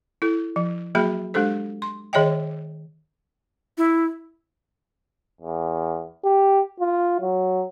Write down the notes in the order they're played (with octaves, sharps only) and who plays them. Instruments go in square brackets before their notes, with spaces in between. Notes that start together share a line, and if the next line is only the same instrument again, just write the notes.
[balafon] E4 A4
F3
F#3 A#3 F#4 G#4 E5 B5
G#3 D4 G4 A4 C5
C6
D#3 G#4 C#5 D#5 E5 G5
[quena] E4
[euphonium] E2
G4
F4
F#3